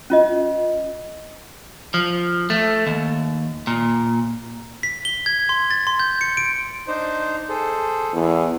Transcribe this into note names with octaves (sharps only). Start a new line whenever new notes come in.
C#4 F4 D#5
F3
A3
D#2
A#2
B6
G7
G#6
C6
A6
C6
G6
C#7
D7
D4 D#4 C5
G#4 A4 C5
E2 G#4